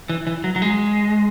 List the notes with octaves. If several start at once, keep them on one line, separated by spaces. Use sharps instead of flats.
E3
E3
F#3
F#3
G#3